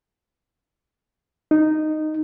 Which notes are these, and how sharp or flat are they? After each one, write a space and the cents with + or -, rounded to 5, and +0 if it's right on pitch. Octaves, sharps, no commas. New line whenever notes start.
D#4 -10